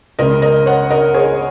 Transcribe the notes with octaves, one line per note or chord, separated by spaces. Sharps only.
C#2 C#3 A#4 D#5
A#4 D#5
C#5 F#5
A#4 D#5
G#4 C#5